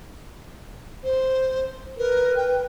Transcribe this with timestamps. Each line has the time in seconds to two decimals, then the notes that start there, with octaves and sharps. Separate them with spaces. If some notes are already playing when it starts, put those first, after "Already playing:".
1.04 C5
1.98 A#4 B4
2.36 G5